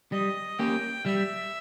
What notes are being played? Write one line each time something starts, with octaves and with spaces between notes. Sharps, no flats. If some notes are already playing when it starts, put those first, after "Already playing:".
G3 D#5
A#3 C#4 G4 G5
G3 E5